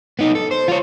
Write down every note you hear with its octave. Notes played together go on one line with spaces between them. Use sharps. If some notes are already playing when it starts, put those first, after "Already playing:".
B3 D#4
A4
C5
F4 C#5